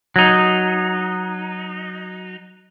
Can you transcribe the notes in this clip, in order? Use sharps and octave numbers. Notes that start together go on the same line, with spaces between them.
F#3 D#4